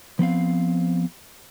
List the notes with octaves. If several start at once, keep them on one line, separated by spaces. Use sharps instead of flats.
F3 B3 C4 F5